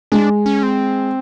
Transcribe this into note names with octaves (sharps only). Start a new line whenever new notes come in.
G#3 D4
C#4
C4